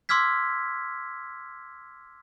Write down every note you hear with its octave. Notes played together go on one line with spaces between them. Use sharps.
C6 D6 E6 F6 G#6 B6